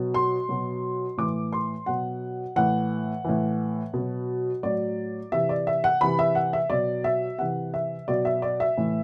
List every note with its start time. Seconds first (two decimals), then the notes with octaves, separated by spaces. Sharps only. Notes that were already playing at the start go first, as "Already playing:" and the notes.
Already playing: B2 F#3
0.14 C6
0.49 B2 F#3
1.17 A2 E3 D6
1.53 C6
1.86 B2 F#3 F#5
2.56 A2 E3 F#5
3.25 A2 E3
3.94 B2 F#3
4.63 A2 F#3 D5
5.32 C3 E3 E5
5.49 D5
5.67 E5
5.84 F#5
6.01 C3 E3 B5
6.19 E5
6.35 F#5
6.53 E5
6.70 B2 F#3 D5
7.04 E5
7.39 C3 E3 F#5
7.74 E5
8.08 B2 F#3 D5
8.25 E5
8.42 D5
8.60 E5
8.77 A2 E3